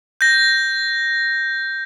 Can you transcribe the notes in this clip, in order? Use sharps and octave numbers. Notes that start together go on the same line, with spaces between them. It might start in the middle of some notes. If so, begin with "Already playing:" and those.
G6 A#6